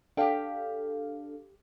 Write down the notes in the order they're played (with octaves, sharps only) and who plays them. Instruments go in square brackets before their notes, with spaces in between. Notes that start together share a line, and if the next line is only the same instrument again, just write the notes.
[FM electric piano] D4 A4 F5 [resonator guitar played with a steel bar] G4 G5